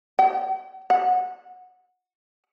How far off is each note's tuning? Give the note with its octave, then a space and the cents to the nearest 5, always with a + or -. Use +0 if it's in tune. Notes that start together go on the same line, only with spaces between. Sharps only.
F#5 +40
F#5 -20